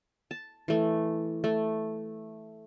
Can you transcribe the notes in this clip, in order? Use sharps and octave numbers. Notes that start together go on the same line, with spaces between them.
A5
E3 A3
A3